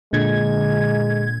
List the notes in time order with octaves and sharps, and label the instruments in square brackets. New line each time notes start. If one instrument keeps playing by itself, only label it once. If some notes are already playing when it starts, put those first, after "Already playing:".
[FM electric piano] A#2 D3 G#6 [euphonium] G#3